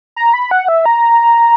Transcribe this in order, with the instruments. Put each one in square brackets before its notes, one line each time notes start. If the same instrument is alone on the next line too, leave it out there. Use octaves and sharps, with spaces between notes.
[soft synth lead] A#5
B5
F#5
E5
A#5